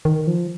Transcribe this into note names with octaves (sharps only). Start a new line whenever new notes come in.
D#3
F3